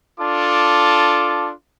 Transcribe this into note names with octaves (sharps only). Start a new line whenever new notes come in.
D4 F4 A4 D6